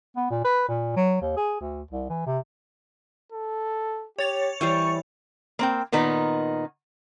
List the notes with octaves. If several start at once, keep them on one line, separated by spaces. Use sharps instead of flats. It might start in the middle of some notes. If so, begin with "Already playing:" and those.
B3
A#2
B4
A#2
F#3
D#2
G#4
D2
C2
E3
C3
A4
G4 C#5 A6 F7
E3 G3 C5 C#6
A#3 C4 G5
A#2 D#3 B3 D#4